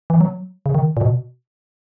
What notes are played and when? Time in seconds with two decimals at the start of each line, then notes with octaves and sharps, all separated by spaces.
0.10 E3
0.21 F#3
0.66 C#3
0.75 D#3
0.97 A#2
1.01 B2